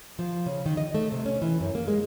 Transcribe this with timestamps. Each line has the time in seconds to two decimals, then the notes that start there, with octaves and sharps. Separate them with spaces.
0.19 F3
0.46 C#3
0.66 D#3
0.77 D#5
0.94 A3
1.12 C3
1.26 C#4
1.42 E3
1.61 F#2
1.75 A#3
1.88 G#3